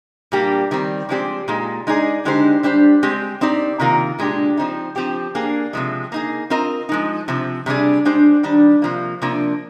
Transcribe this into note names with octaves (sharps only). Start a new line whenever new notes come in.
A#2 G3 A#3 D4 G4
D#3 G3 C4
F3 G#3 C4 G4 D5
A#2 G#3 D#4
G#3 D#4 G#4 D5
D3 G#3 D#4 G4 C5
G3 D4 G4 C5
G#3 C4 G4
C4 D#4 G4 D5
C3 D#3 A#3 F4 A#4
A#2 G#3 D4 G4
F3 C4 D#4
F3 C4 G4
A#3 D4 G#4
C3 F3 G#3
A#3 D#4 G#4
C4 F4 A#4 D#5
F3 G#3 D#4
C3 F3 C4
C3 G3 D4 G#4 D5
G#3 D4 G4 C5
D#3 G3 D4
C3 F3 A#3
C3 F3 A#3 D4